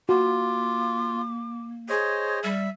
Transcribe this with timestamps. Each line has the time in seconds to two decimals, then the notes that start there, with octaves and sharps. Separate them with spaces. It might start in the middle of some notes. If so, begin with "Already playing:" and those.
0.09 A#3 F4 F#4 D6
1.89 G#4 C5 C#5 D#5
2.44 G3 E5